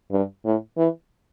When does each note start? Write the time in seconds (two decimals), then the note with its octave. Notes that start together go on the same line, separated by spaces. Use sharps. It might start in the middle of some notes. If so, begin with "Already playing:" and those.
0.11 G2
0.45 A2
0.77 E3